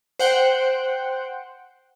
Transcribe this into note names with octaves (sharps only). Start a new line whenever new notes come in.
C5 F#5 G5